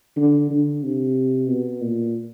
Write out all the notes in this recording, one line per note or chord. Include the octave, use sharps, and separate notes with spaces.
D3
D3
C3
B2
A#2